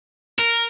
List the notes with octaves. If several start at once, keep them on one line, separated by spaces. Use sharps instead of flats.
A#4